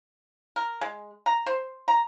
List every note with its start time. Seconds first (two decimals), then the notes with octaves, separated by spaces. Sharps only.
0.56 A#4
0.81 G#3
1.26 A#5
1.46 C5
1.88 A#5